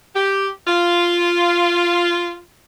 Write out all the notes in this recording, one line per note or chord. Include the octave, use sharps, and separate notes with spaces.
G4
F4